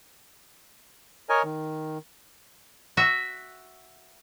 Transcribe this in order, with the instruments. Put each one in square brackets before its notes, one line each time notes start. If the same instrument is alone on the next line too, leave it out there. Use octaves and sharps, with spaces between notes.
[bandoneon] A#4 C#5 D#5 G#5
D#3
[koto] F#4 E5